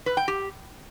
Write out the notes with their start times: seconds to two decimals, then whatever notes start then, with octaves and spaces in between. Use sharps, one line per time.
0.06 B4
0.17 G5
0.28 G4